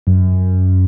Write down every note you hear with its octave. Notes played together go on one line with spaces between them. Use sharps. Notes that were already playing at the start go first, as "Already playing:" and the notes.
F#2